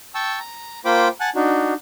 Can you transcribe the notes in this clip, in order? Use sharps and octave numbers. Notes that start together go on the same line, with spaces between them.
G5 A5 C#6 E6
A#5
A#3 F4 C5 G5 B5 D6
F#5 G#5 A5 F#6
D4 D#4 F#4